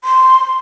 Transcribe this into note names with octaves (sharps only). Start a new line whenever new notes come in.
C6